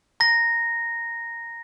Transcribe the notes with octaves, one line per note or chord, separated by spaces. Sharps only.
A#5 A#6